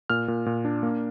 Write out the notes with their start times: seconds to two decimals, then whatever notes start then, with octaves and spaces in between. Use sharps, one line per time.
0.10 A#2 F6
0.28 A#2
0.46 A#2
0.65 D4
0.83 A#3